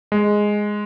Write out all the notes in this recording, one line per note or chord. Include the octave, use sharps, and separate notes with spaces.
G#3